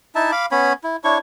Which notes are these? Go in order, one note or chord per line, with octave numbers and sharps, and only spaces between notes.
D#4 E4 E5 A5
F5 B5 D6
B3 C#4 C#5 B5
E4
D4 E4 C#5 C#6